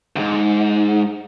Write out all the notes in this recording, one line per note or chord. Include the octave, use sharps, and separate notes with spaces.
D2 G#2